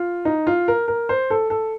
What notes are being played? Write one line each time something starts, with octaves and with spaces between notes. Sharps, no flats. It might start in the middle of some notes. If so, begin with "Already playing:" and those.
Already playing: F4
D#4
F4
A#4
A#4
C5
A4
A4